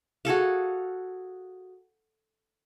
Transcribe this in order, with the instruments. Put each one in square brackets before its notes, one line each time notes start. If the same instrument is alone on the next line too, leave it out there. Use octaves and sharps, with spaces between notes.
[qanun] F#4 G#4 A4 F5